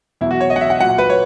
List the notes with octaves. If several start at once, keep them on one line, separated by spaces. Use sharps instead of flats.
E2 B2 F#3 E4
F#4
C#5
D#5
F#5
E5
F#5
A#2 F#3 F#5
B4
C#5